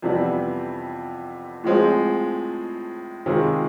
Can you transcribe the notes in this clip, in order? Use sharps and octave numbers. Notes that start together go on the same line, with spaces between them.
F2 C3 E3 G3 B3
A2 F3 G#3 C4
C3 D#3 G#3 C4 F4